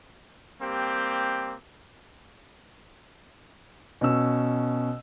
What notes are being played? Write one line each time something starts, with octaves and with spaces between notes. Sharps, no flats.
G3 A#3 C4 G4
B2 C#4 E6